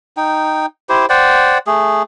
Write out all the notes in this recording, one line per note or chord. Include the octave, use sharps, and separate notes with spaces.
D#4 G5
E4 G4 C5
C5 D5 F#5 G5
A3 G#4